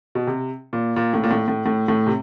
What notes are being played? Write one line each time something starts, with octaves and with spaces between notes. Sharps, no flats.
B2
C3
A#2
A#2
A2
A#2
A2
A2
A2
A2
C3